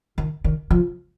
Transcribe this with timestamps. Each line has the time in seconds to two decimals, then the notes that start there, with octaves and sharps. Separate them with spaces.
0.18 D#3
0.44 D#3
0.71 F3